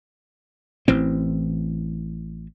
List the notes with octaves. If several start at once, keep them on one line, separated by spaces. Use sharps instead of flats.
A1 E3 C4